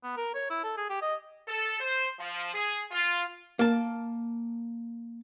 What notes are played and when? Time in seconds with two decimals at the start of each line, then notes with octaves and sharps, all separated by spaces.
0.04 B3
0.17 A#4
0.34 C#5
0.50 E4
0.64 A4
0.77 G#4
0.90 G4
1.02 D#5
1.47 A4
1.80 C5
2.18 F3
2.54 G#4
2.91 F4
3.59 A#3 A5